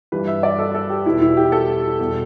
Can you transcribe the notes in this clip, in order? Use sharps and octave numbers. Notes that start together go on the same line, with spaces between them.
G2 E3 G3 B4
E5
D5
A4
A4
G4
E2 B2 G3 E4
E4
G4
A4
E2 B2 G3